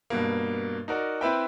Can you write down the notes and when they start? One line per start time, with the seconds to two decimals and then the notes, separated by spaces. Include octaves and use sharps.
0.10 G2 B2 A#3
0.88 D#4 F#4 A#4 D5
1.21 C4 E4 B4 E5 G5